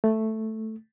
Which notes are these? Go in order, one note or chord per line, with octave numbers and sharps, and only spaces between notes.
A3